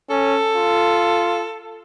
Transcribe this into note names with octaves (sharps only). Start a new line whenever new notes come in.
C#4 A4
F4